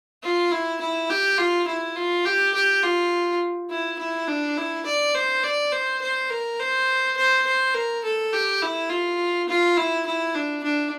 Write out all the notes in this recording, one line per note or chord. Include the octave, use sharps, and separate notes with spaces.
F4
E4
E4
G4
F4
E4
F4
G4
G4
F4
E4
E4
D4
E4
D5
C5
D5
C5
C5
A#4
C5
C5
C5
A#4
A4
G4
E4
F4
F4
E4
E4
D4
D4